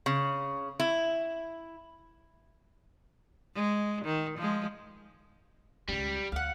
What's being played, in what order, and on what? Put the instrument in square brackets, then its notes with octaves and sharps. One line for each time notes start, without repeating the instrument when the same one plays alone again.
[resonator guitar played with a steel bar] C#3
E4
[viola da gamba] G#3
D#3
F3 G#3
[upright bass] C#2 C#4 [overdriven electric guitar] G3
[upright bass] D2 [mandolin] F5 F#5